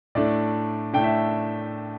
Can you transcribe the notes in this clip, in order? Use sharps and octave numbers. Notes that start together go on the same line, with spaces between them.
A2 A3 D4 D5
A2 A3 D4 G5
E5